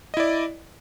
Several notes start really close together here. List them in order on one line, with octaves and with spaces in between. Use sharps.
D#5 E4 D5